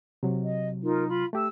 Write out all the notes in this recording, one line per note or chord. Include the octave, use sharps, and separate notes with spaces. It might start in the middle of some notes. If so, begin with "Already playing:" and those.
C3 F#3
D#5
D#4 F4 A#4
F4 B5
A3 G4 E6